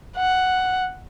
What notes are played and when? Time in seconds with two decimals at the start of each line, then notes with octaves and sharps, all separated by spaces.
0.17 F#5